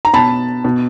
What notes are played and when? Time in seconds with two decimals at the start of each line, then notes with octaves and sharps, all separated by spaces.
0.05 A#5
0.14 B2 A5 B5
0.65 B2